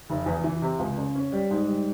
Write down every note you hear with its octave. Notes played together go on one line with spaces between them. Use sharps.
F1
E2
E3
C3
C#2
C#3
C#4
G3
G#2
G3